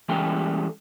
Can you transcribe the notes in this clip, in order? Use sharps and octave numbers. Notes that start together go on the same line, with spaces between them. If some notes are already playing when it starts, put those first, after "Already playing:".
E3 G3 G#3 C#4 A4 G5